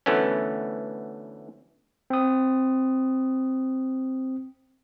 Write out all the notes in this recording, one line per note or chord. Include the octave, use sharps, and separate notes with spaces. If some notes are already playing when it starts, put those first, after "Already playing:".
D2 E3 A3 B3 C#4
C4 D#6